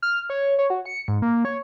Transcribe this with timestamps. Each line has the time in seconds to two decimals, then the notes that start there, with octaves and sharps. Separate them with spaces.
0.02 F6
0.30 C#5
0.59 C#5
0.70 F#4
0.85 C#7
1.08 G#2
1.22 A#3
1.45 C#5